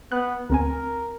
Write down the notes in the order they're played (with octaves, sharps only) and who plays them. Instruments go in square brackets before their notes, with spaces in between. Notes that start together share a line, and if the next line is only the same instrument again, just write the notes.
[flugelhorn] B3 [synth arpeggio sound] F#6
[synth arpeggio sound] D2 C4 G#5 [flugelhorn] A#4